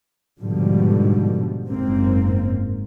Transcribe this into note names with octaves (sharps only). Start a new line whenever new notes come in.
G#2 B2 D3 F3 G3
F#1 G#2 A#3 C4